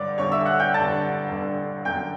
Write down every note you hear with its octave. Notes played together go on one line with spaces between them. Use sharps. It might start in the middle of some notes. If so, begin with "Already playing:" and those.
Already playing: G2 D3 C#5 D5 D6
G2 D3 C#5 C#6
E5 E6
F#5 F#6
G5 G6
G2 D3 A5 A6
G2 D3
F#2 D3 G5 G6